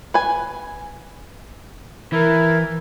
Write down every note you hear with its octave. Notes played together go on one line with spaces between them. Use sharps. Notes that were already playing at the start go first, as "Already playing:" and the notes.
B4 G#5
E3 E4 A#4